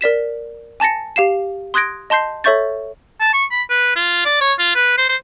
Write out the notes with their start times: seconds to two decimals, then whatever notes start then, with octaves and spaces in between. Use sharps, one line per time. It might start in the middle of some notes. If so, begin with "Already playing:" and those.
0.01 A#4 D5 B6 E7
0.80 G#5 A5 A6 A#6 C#7
1.16 G4 F5 C7 E7
1.74 C6 D#6 F#6 G#6 A#6 D7
2.10 D#5 A5 C6 G6 C7
2.44 A4 C#5 E5 C#6 G6 A6
3.21 A5
3.33 C#6
3.51 B5
3.70 B4
3.96 F4
4.25 D5
4.41 C#5
4.59 F4
4.75 B4
4.98 C5
5.09 C5